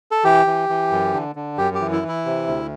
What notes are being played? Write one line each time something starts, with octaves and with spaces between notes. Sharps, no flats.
A4
E3 G4
E3
E3
F#2
D3
D3
F#2 G4
G4
E3
E4
E3
E4
C3
D2